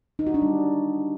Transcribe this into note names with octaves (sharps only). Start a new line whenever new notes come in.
D#4
F#4
D4
G3